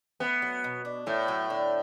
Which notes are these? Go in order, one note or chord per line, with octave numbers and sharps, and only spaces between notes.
A3 B3
F#3
B2
D4
A2 A3
F#3
D3